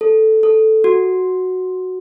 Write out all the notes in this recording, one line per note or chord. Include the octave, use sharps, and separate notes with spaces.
A4
A4
F#4